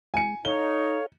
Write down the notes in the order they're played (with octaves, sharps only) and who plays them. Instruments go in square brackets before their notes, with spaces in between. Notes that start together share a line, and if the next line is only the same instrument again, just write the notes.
[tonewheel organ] G#3 [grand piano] G#5 C#7
[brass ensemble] D#4 [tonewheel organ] A4 F5 [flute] C#5 [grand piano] G7